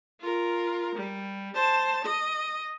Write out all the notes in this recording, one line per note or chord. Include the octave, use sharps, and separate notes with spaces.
F4 A#4
G3
C5 A5
D#5